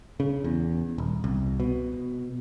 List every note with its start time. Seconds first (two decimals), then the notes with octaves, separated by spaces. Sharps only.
0.20 C#3
0.44 E2
0.98 D#1
1.24 C2
1.60 B2